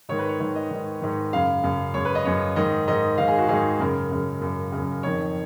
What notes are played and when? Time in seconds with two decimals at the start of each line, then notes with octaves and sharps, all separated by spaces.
0.09 G#2 D#3 C#5
0.19 B4
0.29 C#5
0.40 G#2 D#3 C#5
0.56 D#5
0.71 G#2 D#3
1.01 G#2 D#3
1.33 F#2 C#3 F5
1.64 F#2 C#3
1.94 F#2 C#3 C#5
2.05 B4
2.15 D#5
2.25 F#2 C#3 C#5
2.56 G#2 D#3 D#5
2.88 G#2 D#3 D#5
3.18 G#2 D#3 F5
3.28 G#4
3.38 F#4
3.49 G#2 D#3 G#4
3.80 F#2 C#3 A#4
4.12 F#2 C#3
4.42 F#2 C#3
4.72 C#3
4.78 F#2
5.03 F2 D#3 C#5